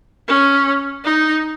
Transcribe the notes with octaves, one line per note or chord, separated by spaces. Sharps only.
C#4
D#4